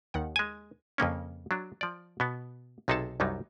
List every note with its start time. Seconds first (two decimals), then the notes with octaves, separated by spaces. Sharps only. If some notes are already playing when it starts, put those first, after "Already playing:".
0.14 D#2 D#3 F#5
0.36 G#3 G#5
0.98 F2 C#3 A#3 C#4
1.51 F#3 D4
1.81 F3 D5
2.20 B2 B3
2.88 B1 C3 D#4 G#4 A4 A5
3.20 C2 F#2 F#3 G3 D#4